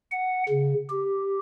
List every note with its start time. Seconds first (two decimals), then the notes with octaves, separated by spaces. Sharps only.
0.11 F#5
0.49 C#3
0.89 G4